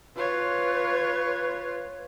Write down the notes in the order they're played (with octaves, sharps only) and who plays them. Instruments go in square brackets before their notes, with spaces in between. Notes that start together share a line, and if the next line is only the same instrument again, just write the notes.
[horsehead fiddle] F4 C#5 [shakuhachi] B4